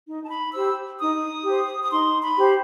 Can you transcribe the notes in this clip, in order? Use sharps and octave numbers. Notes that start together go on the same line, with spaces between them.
D#4
A5
B5
G4 C5 E6
D#4 D#6
G4 C5
D#6
D#4 C6
B5
G4 C5